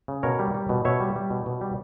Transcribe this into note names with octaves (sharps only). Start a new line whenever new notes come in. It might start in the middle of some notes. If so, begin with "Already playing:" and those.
C#3
B2 A#4 C#5
G3
G3
B2
B2 C#5 E5
G3
G3
B2
B2
G3